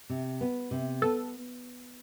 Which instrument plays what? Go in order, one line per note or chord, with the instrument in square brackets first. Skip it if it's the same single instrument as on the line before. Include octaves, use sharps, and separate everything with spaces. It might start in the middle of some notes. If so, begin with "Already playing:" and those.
[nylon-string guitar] C3
B3
C3
[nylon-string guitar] B3 [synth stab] A4